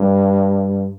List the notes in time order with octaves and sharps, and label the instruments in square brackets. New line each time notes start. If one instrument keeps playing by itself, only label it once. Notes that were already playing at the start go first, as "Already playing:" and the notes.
Already playing: [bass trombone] G2